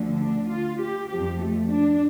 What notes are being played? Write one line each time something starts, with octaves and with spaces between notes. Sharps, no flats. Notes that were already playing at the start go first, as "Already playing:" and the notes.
Already playing: D2 D3 F3
D4
F4
G4
F2 F3 G4
A3
D4